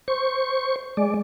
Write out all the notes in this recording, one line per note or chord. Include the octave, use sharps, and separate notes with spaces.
C5 C#6
G#3 D5